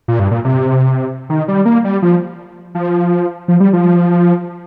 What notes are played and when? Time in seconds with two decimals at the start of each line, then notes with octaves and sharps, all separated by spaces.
0.08 A#2
0.19 G2
0.31 A#2
0.45 C3
1.30 D#3
1.48 G3
1.65 A#3
1.84 G3
2.02 F3
2.75 F3
3.48 F3
3.60 G3
3.73 F3